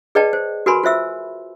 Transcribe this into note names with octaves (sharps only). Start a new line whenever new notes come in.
G#4 B4 D5 D#5 G5 A5
C5
F#4 A#4 B4 G#5 B5 C6
F4 C5 E5 E6